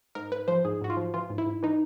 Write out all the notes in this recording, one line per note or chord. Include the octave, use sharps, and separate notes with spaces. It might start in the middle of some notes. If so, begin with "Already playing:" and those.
G#2 A#4
G#2 B4
F3 C5
G#2 G#4
G#2 F#4
F4
F3
E3 F4
G#2
E4
G#2
E3 D#4